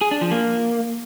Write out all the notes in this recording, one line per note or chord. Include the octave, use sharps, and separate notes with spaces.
G#4
D4
F3
A#3